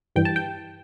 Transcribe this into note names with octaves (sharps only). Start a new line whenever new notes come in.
G2 E3 G3 G5
A5
G5